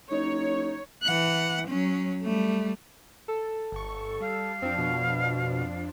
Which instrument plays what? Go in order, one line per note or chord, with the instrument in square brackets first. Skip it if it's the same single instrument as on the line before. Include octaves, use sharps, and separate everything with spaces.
[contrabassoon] F#1 [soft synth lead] D#4 [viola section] C#5
[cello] E3 F#5
F#3 C#4
G3 A3
[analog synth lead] A4
[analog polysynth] G1 C#6
[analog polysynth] G3 [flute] F5
[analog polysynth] F2 F3 D4 [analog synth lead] C4
[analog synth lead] B2